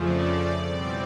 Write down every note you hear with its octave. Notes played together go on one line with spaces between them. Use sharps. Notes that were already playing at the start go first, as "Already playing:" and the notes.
Already playing: F2 C#3 F3 A3 D5
E2 B2 G3 C4 D5